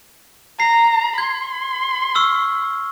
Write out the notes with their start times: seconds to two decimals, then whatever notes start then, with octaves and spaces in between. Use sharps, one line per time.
0.60 A#5 C7
1.18 C6 G#6
2.15 C#6 E6 F6